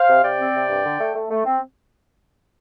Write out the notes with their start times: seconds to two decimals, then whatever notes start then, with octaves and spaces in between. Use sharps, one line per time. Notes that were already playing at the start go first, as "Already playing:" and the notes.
Already playing: C5 F5
0.09 C3
0.24 C3 D5 G5
0.40 C4
0.54 C3
0.69 G2
0.86 D3
1.00 A3
1.15 A3
1.31 A3
1.46 C4